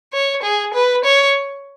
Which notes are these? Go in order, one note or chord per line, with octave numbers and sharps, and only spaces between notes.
C#5
G#4
B4
C#5